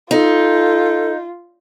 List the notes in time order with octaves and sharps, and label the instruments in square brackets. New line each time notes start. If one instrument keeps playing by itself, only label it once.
[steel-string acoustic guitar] D#4 [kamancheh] F4 [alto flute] A4